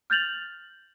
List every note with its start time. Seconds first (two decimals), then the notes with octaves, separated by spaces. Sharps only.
0.10 F6 G6 A6 F7 F#7